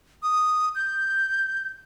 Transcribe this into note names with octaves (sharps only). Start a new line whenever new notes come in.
D#6
G6